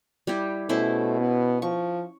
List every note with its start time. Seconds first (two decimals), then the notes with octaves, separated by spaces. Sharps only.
0.27 G3 E4 G4
0.69 B2 A3 C#4 E4 C5
1.20 B3
1.62 F3 C#6